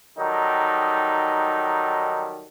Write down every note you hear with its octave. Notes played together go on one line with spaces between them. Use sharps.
D#3 F#3 G3 D#4 A4